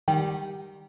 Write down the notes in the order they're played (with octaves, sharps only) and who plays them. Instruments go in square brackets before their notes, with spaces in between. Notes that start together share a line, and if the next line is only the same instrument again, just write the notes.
[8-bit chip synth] D#3 G3 [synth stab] G4